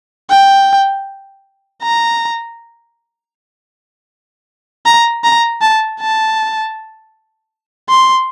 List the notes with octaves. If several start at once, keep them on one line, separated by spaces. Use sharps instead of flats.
G5
A#5
A#5
A#5
A5
A5
C6